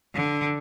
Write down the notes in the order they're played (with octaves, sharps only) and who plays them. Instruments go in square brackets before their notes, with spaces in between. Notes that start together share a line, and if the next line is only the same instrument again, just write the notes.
[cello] D3